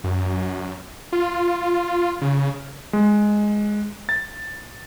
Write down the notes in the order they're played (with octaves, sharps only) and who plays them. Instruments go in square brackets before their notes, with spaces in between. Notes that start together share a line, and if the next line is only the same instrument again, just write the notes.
[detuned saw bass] F#2
F4
C#3
[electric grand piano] G#3
A6